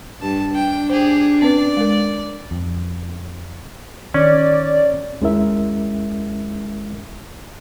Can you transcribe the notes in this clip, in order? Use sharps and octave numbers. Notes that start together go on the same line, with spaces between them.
G2 A5
D4 G5
G4 G#4 C5
C4 C#4 B4 D5
G#3 A#4
F2
D#3 C#4 D5
D#2 G#3 C#4 E4 A#4 E5